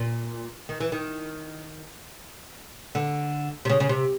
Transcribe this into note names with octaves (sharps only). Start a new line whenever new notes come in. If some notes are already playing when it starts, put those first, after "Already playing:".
Already playing: A#2
D#3
E3
D#3
D3
C3
C#3
C#3
C3